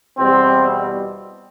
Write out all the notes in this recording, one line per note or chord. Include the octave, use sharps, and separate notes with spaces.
E2 B2 G3 C4